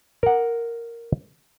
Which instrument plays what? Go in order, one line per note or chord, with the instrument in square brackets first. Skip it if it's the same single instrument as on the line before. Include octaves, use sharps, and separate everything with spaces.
[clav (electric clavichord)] A#4 F#5